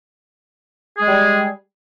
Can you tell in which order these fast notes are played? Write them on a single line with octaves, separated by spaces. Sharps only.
G#4 G#3 G3